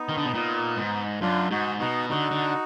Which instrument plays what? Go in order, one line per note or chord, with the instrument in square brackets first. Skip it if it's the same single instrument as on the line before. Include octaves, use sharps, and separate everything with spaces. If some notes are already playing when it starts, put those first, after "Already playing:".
Already playing: [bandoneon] B3 D#4
[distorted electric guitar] D#3
D3
B2
A#2
G#2
[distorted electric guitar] F#2 [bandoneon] D4 F4
[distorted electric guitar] G#2 [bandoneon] D#4 F#4
[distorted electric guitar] B2 [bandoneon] D#4 F#4
[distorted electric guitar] D3 [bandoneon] D#4 F#4
[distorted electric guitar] D3